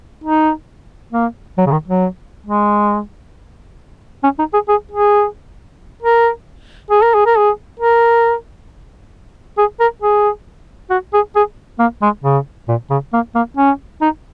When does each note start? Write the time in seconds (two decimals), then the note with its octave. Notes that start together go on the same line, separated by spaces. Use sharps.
0.24 D#4
1.12 A#3
1.58 F#3
1.67 C#3
1.72 D#3
1.88 F#3
2.46 G#3
4.24 C#4
4.39 D#4
4.54 G#4
4.68 G#4
4.91 G#4
6.02 A#4
6.91 G#4
7.02 A#4
7.14 G#4
7.26 A#4
7.37 G#4
7.80 A#4
9.58 G#4
9.80 A#4
10.02 G#4
10.90 F#4
11.13 G#4
11.36 G#4
11.79 A#3
12.02 G#3
12.24 C#3
12.68 A#2
12.90 C#3
13.13 A#3
13.35 A#3
13.57 C#4
14.01 D#4